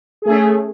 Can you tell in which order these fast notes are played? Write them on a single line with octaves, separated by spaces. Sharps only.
G#4 A3 C#4